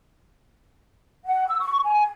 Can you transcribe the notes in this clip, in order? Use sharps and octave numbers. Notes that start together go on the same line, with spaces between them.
F#5
E6
C#6
G#5